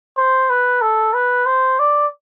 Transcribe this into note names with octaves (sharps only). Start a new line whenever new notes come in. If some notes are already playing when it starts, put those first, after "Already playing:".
C5
B4
A4
B4
C5
D5